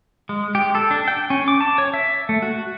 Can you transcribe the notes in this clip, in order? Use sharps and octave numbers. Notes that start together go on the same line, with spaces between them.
G#3
G4
A4
D4
G5
C#4
D6
A5
C#5
E5
A3
F#4